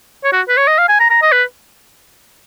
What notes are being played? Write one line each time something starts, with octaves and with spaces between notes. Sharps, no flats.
C#5
F#4
B4
C#5
D#5
F5
G#5
A#5
A#5
D#5
B4